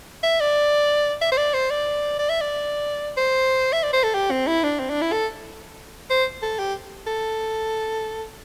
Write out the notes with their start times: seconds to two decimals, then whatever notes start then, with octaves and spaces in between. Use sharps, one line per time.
0.23 E5
0.40 D5
1.21 E5
1.32 C5
1.37 D5
1.54 C5
1.70 D5
2.19 D5
2.29 E5
2.41 D5
3.17 C5
3.73 E5
3.83 D5
3.93 C5
4.03 A4
4.14 G4
4.31 C4
4.47 E4
4.63 D4
4.79 C4
4.90 D4
5.01 E4
5.12 A4
6.10 C5
6.42 A4
6.59 G4
7.07 A4